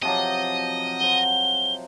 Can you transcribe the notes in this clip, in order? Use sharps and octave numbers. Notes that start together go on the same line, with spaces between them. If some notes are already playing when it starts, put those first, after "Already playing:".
C3 F3 F#3 D#5
C5 F#5 G7